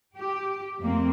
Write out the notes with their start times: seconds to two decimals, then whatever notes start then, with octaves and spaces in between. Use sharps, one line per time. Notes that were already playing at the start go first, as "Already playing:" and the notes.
0.16 G4
0.81 F2 A3 A#3 C4